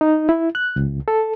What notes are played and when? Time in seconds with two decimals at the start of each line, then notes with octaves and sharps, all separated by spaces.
0.01 D#4
0.29 E4
0.55 F#6
0.76 C#2
1.08 A4